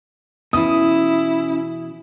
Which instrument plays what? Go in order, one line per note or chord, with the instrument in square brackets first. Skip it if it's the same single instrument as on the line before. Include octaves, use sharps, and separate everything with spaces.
[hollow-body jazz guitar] B2 E3 [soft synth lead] C#4 [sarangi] E4 [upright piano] D#6